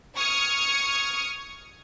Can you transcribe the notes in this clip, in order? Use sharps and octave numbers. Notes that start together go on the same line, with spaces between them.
C#6 D#6 F6 G#6 C#7